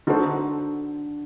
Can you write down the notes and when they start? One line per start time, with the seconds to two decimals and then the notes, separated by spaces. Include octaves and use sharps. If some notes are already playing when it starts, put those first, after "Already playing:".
0.07 D3 D#4 F#4 A4 C5